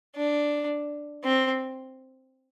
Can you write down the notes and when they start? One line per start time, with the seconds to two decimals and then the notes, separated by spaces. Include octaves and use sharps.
0.16 D4
1.24 C4